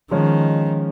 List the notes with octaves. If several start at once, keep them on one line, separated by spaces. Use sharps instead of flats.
D#3 F3 G#3 C#4